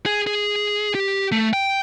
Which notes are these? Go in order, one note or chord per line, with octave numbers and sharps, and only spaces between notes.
G#4
G#4
G4
A3
G5